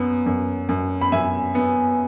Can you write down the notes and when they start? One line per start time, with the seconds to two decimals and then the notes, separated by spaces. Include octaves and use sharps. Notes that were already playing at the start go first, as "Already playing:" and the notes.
Already playing: F#2 B3
0.26 F#2
0.69 F#2
1.01 B5
1.12 F#2 E5 G#5
1.55 B3